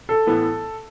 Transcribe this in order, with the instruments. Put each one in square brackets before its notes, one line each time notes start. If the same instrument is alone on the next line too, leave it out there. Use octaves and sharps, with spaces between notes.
[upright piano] A4
[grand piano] A2 E3 B3